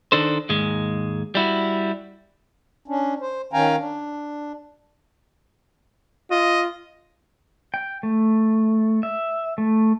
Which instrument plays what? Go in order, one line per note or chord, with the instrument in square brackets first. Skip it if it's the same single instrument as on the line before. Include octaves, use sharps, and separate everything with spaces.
[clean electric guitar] D#3 D4 A4 C5
D#2 G#2 G#3
G3 E4 F#4
[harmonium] C#4 D4
C5
D#3 C#4 F5 G5 G#5 A#5
D4
[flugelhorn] F4 [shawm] D#5
[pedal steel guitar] G5
A3
E5
A3